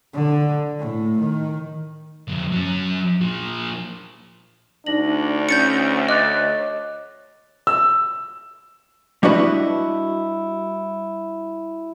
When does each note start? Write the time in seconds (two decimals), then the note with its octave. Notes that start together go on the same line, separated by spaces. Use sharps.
0.14 D3
0.79 A2
1.20 D#3
2.28 F2 D3
2.52 F#3 C#4
3.21 A#2 F3
4.86 D2 D4 D#4 A#6 F#7
5.49 C#4 G6 A6 C#7
6.09 C#5 D#5 D6 F#6 A6
7.67 E6
9.23 G3 D4 E4 F#4 B4 D#5